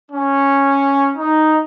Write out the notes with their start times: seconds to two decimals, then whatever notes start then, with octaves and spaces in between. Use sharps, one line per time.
0.11 C#4
1.16 D#4